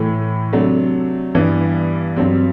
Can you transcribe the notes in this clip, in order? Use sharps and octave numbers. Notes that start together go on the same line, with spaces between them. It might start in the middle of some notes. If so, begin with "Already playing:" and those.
Already playing: A2 E3 A3
C3 F#3 A3 D4
G2 E3 B3 D4
G2 F#3 C4